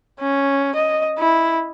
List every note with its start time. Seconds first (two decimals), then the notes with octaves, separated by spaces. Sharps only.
0.20 C#4
0.75 D#5
1.18 E4